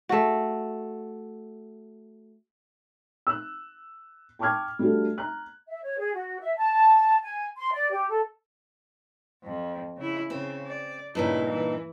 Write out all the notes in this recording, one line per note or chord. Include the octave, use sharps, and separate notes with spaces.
A3 F#4
E6 F#6
G5 A5 C#6 D6 F6 G#6
G3 A3 D4 F#4 A4
A#5 F#6
E5
C#5
G#4
F#4
E5
A5
G#5
C6
D5
G4
A4
F2
C#3 E4
C#3 C4
D5
G2 A#2 C#3 D#4 E4
E3